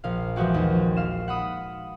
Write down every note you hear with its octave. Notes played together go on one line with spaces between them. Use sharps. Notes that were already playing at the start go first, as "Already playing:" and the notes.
A#1 F5
E3 F3 G#3 F#4 G4
D#2
F5 E7
F#5 B5 D#6